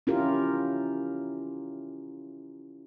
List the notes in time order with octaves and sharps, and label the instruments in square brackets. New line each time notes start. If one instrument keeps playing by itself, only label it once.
[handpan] C#4 E4 F4 G4 A#4